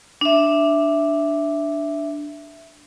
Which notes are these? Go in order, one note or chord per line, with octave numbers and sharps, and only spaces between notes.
D4 E5